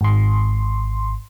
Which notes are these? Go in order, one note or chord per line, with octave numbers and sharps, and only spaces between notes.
G#1 C6